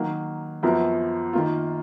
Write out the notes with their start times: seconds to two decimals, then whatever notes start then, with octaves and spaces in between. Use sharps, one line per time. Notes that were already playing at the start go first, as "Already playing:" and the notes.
Already playing: D#3 F#3 A#3
0.63 F#2 F3 B3 F#4 A#4
1.33 D#3 A#3 F4